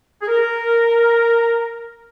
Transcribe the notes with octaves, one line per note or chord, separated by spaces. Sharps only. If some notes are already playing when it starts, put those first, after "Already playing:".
G#4
A#4